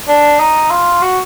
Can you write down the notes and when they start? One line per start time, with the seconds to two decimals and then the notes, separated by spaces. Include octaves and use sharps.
0.08 D4
0.40 D#4
0.71 F4
1.02 F#4